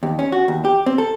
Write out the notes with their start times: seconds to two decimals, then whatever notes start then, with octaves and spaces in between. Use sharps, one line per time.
0.03 D#2
0.19 C#4
0.32 F#4
0.48 D#2
0.65 G4
0.86 C4
0.98 A4